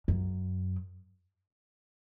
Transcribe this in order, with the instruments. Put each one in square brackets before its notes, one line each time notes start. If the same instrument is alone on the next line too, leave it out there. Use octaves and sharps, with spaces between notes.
[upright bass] F#2